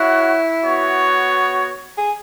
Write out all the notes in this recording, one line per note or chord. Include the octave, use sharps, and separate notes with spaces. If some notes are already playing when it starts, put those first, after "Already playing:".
Already playing: E4 F#4 C#5 F#5
B3 F#4 C#5
G#4